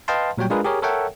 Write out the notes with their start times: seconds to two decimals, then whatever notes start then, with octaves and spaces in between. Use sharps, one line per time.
0.08 B4 D#5 F5 G5 A5 C6
0.38 A#2 F#3 G3 C#5 G5
0.50 G#3 D4 F4 G#4 A#4 B4
0.64 G4 G#4 A#4 C#5
0.82 A4 A#4 C#5 E5 F#5 G5